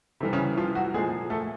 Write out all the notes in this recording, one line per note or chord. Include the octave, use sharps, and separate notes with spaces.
C3 E3 G3
C#3 C#4
F3 F4
F#3 F#4
A#2 F3 G#3 G#4
A3 A4